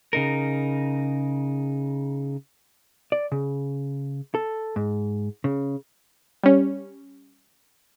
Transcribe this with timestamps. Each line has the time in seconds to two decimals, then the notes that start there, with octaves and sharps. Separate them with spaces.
0.13 C#3 D#4 A#4
3.12 D5
3.32 C#3
4.35 A4
4.76 G#2
5.44 C#3
6.43 G3 C#4